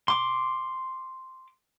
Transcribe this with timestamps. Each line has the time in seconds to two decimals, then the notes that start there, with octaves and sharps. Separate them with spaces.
0.08 C6 D6